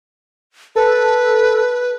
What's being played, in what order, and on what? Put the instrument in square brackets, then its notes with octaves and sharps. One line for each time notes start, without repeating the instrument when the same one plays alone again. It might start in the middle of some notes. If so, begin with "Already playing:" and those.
[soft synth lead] A4 [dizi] B4